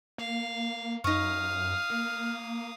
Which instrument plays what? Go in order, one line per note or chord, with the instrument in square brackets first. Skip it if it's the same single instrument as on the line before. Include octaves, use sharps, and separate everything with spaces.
[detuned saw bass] A#3 [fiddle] F5
[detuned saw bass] F#2 [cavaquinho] D#4 C#6 [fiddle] F5 D#6 [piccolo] F6
[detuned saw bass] A#3